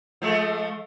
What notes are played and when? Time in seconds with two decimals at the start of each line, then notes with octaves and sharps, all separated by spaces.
0.22 F3 G#3 A3